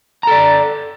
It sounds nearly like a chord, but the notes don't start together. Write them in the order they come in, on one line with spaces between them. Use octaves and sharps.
A#5 A4 D5